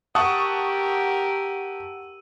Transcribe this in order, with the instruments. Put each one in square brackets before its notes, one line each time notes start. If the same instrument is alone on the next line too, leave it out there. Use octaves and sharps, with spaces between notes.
[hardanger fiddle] G4 A#4 [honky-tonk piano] F#5 A5 C#6 [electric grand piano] D#6 [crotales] E6 D#7